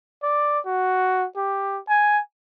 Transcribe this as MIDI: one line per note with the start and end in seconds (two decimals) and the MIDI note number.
0.23 0.59 74
0.66 1.26 66
1.36 1.79 67
1.88 2.20 80